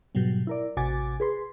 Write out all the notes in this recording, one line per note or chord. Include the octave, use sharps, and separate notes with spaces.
G#2 B2 F#3 G3
E4 A#4 D5
A1 C3 F#4 G#5 D6 A6
G#4 B4 C6